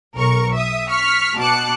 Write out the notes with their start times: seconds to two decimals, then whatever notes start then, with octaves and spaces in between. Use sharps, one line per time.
0.15 B1 A#4 C#6
0.53 E5 D#6
0.88 C#6 F6 B6
1.37 B2 A5 D6 F#6 C#7